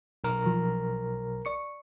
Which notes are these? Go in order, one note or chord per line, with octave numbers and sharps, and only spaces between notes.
B1 A#4
F3
D5 C#6 C#7